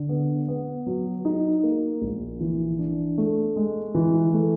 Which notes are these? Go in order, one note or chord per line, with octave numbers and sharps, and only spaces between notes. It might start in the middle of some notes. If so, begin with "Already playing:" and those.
Already playing: D3
B3
B3
F#3
D#4
A#3
A#1
E3
D4
A3
G#3
E3
A3